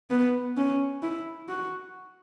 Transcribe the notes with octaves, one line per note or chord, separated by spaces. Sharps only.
B3
C#4
E4
F#4